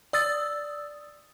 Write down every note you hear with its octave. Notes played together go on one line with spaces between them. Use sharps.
D5 D#6 E6 A6